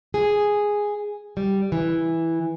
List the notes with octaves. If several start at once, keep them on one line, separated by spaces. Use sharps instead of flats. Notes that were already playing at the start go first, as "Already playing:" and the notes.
G#4
G3
E3